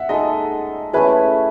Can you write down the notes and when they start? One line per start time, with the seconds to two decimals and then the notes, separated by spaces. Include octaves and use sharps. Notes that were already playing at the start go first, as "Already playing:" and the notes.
Already playing: E5 F#5
0.09 G#3 D#4 A4 D#5
0.93 A3 C#4 E4 G#4 B4